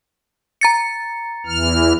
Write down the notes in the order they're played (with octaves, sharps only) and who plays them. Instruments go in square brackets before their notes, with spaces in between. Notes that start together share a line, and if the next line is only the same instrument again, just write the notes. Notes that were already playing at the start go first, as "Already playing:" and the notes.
[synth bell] A#5 A6 C#7
[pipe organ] E2 E3 F6